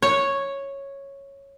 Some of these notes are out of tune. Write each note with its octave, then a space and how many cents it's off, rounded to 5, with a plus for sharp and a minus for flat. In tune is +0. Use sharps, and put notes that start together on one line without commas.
C#5 -5